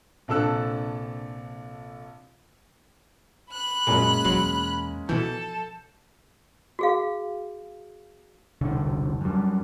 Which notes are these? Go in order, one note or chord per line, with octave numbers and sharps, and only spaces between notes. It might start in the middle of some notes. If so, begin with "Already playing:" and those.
A#1 C3 D4 A4 E6 F#6
B5 F#6
F#2 A#2 G#3 A#3 C#4
E2 B2 F#3 C6
B2 E3 F3 A4 G6
F#4 G#4 F5
E1 C2 D3
F#2 G3